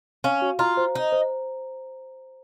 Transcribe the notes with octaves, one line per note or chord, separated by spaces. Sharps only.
C#4 F5
F#4
F4 A#5
C5
D#4 A#5
C5